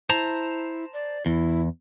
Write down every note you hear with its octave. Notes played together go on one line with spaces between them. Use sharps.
E4 C5 A5 A#5
D5
E2 E4